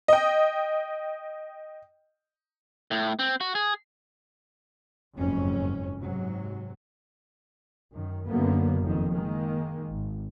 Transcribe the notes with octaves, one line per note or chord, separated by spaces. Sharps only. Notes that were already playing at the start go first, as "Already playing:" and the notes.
D#5 G5
A2
C4
F#4
G#4
F#1 F2 G#2 C#4
G#2 C3 F#3
F#2 D#3
F#2 D3 A#3 B3
F#1 F2 D#3
D#3 G#3 A#3
G#1